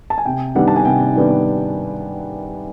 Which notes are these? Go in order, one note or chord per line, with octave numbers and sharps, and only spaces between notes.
A5
G#5
C3 G5
D#3 G3 B3 D4 F#5
A5
G#5
C3 G5
D#3 G3 B3 D4